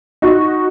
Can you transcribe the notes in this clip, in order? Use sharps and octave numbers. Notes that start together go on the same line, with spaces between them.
D#4 F#4